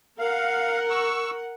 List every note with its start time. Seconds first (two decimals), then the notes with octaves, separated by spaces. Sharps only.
0.19 A#4 F5 F#5
0.90 C#6 E6